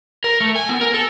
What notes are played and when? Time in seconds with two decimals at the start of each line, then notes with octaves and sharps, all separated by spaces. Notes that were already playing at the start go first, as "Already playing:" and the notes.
0.24 A#4
0.40 A3
0.56 G#5
0.69 B3
0.81 A#4
0.94 A4